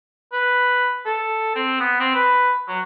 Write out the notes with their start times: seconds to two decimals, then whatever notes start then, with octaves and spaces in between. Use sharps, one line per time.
0.33 B4
1.06 A4
1.55 C4
1.80 B3
2.00 C4
2.15 B4
2.68 F#3